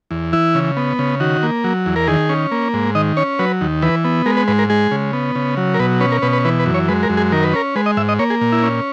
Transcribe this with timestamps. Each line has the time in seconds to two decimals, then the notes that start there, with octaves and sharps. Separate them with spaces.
0.11 E2
0.33 E3 E4
0.55 C#3
0.77 B3
0.99 C#3
1.20 D#3 F#4
1.43 A#3
1.64 F#3
1.86 E2
1.96 A#4
2.08 D#3 G#4
2.29 C#4
2.51 A#3
2.74 G#2
2.95 D#3 D#5
3.17 C#4 C#5
3.39 F#3 B4
3.61 D#2
3.82 E3 B4
4.04 B3
4.26 G#3 A#4
4.37 B4
4.48 G#2 B4
4.59 A#4
4.70 G#3 G#4
4.91 C#3
5.13 B3
5.35 C#3
5.57 F#3
5.74 A#4
5.79 B2 B4
6.01 C#4 B4
6.12 A#4
6.22 B2 B4
6.33 B4
6.45 E3 B4
6.59 B4
6.66 F#2
6.74 C#5
6.88 G#3 B4
7.03 A#4
7.10 F#2
7.17 G#4
7.32 D#3 A#4
7.44 B4
7.53 C#4 A#4
7.76 G#3 B4
7.86 D#5
7.97 G#2 E5
8.09 D#5
8.19 A#3 C#5
8.30 G#4
8.41 A#2
8.52 E4
8.63 C#4